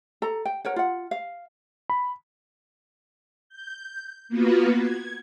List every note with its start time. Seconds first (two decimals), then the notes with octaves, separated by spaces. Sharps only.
0.22 A4 A#5
0.45 G5
0.65 A#4 C#5 F#5
0.76 F4 F#5
1.11 F5
1.90 B5
3.49 G6
4.29 A#3 B3 F4 F#4 B4
4.77 G#6